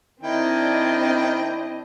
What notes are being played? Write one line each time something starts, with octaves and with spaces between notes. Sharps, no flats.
D#3 C4 D4 E4 D#5 G5